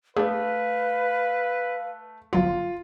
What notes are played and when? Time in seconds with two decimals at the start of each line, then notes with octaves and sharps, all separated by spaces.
0.17 A3 D4 G#4 B4 F5
2.33 G1 F#3 F4 F#4